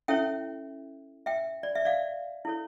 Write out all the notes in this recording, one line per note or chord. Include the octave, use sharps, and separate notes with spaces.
C#4 E4 A4 C#5 E5 G5
E5 G5
D5
E5
D5 F5
E4 A4 C#5